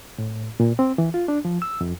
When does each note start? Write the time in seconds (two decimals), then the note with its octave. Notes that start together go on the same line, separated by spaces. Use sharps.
0.18 A2
0.60 A#2
0.79 C4
0.98 E3
1.14 F4
1.28 D4
1.45 F3
1.62 E6
1.81 F2